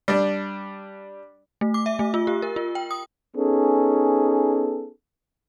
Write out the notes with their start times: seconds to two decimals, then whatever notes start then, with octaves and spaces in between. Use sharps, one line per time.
0.08 G3 D4
1.61 A3
1.74 D6
1.86 E5
1.99 A3
2.14 F4
2.27 G4
2.42 A#4
2.56 F4
2.75 G5
2.91 D#6
3.36 B3 C#4 D#4 G#4 A4